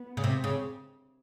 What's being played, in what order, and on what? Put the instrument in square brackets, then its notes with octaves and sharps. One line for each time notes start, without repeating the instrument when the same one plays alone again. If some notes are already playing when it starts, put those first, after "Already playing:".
Already playing: [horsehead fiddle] B3
[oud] C#3
[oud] C3 [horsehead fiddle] C4
[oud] C#3